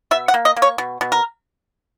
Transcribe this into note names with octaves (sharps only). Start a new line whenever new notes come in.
B2 E5
F#5
A#3
D#5
A#3
C#5
B2
B2
A#4